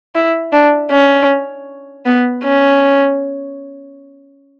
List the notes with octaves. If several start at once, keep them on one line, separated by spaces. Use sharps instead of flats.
E4
D4
C#4
B3
C#4